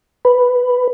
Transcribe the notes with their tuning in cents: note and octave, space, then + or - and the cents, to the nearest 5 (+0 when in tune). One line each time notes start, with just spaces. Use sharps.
B4 +5